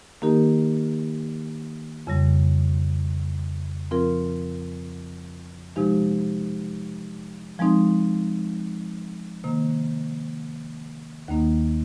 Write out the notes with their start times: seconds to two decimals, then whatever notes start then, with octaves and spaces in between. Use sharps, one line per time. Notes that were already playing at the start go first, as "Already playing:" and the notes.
0.22 D#3 A#3 D#4 G4 A#4
2.07 F2 C#3 G3
3.91 F3 C4 F4 A#4
5.76 C3 F3 G#3 D#4 G4
7.59 F3 G#3 C4 D#4
9.44 C3 D#3 A#3
11.28 D#2 D#3 A#3 D#4